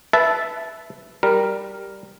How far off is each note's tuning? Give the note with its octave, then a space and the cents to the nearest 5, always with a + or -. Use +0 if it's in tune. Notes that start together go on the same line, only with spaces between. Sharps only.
B4 +0 E5 +0 A5 -10
G3 +0 A#4 +0